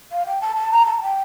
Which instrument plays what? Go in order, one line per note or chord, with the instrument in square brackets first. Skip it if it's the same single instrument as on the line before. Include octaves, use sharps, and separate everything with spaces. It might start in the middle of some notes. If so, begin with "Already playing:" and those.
[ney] F5
G5
A5
A5
A#5
A5
G5